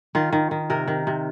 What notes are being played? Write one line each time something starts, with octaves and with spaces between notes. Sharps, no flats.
D#3 F4
D#3
D#3
C3 A#4
D#3
C3